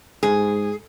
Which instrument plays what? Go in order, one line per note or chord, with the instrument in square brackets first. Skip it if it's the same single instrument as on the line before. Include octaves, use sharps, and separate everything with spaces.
[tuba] G#2 [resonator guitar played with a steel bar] G#4